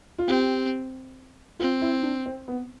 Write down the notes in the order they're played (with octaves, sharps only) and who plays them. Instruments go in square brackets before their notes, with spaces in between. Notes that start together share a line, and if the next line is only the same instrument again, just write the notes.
[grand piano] F4
[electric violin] C4 [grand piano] G4
[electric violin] C4 [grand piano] F4
[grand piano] E4
D4
C4
B3